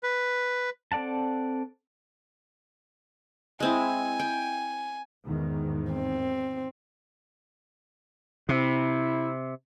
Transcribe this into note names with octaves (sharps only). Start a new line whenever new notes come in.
B4
C4 A4 D5 F#5 A5
G#3 C4 E4 G#5
G5
E2 G#2 D#3
C4
C3 C4 E4